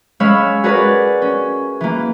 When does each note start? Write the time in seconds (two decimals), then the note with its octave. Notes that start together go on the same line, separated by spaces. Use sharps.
0.20 G#3 C#4 C#5 F5 B5 E6
0.64 F#4 G#4 A#4 B4 C#5 D5
1.22 C#4
1.81 E3 A#3